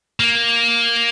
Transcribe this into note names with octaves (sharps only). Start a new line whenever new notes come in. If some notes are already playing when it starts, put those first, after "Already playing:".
A#3